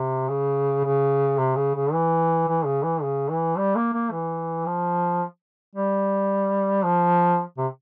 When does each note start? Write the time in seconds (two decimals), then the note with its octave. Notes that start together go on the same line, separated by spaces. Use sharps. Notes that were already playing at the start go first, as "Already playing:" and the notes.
Already playing: C3
0.29 C#3
0.84 C#3
1.38 C3
1.56 C#3
1.75 C#3
1.93 E3
2.48 E3
2.65 C#3
2.83 E3
3.02 C#3
3.30 E3
3.57 G3
3.76 A#3
3.93 A#3
4.12 E3
4.66 F3
5.76 G3
6.85 F3
7.58 C3